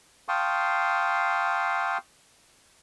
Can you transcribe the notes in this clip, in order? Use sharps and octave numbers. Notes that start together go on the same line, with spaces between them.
F5 G5 A5 C6 C#6 D#6